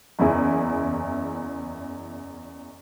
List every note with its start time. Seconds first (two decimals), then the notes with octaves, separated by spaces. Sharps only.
0.19 F#1 E2 E4 G#4